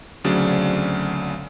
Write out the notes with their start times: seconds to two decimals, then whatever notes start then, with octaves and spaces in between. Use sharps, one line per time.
0.24 D2 C#3 F#3 C4 D4 D5